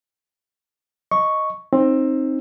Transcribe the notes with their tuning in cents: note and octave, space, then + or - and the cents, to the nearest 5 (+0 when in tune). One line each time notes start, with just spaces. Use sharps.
D#5 +0 C#6 +0
C4 +20 D#4 -5